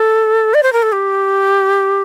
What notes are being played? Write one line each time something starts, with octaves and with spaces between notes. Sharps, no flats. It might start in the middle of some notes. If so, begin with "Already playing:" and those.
Already playing: A4
D5
C5
A#4
A4
G4